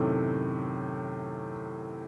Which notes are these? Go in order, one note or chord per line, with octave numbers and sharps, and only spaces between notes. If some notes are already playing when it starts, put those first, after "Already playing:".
Already playing: F#2 A2 C3 D#3 A3 C4